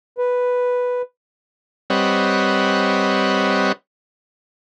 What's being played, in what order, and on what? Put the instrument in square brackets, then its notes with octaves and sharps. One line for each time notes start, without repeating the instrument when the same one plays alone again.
[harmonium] B4
[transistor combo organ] G3 C4 B4 C#5 D#5 F#5